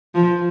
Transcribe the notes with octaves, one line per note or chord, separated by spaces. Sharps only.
F3